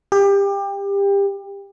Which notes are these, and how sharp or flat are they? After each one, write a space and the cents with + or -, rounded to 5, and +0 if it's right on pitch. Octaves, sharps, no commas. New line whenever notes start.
G4 +25